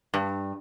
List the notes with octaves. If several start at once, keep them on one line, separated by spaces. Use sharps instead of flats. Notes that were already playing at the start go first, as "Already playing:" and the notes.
G2